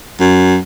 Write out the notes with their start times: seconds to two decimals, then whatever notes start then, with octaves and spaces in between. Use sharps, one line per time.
0.20 F#2